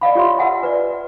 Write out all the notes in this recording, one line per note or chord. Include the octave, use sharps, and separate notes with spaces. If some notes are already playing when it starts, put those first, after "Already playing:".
D5 D#5 F5 B5
F4 G4 C#5 E5 C6
A#4 D#5 E5 F#5 G#5
B4 D5